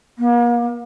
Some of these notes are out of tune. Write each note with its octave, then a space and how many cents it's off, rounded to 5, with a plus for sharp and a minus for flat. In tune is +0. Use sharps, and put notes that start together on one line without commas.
A#3 +40